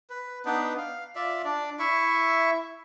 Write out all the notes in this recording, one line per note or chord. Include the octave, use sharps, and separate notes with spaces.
B4
B3 D4 D#4 B4
F5
F4 D5 E5
D4 D5
E4 E5 C#6